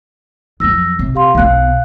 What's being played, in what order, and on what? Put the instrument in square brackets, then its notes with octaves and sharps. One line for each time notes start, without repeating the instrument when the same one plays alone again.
[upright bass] F2 F#3 [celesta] E6 A#6
[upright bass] C3
[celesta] G4 F5 C6
[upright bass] B1 B3 [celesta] F5 F#6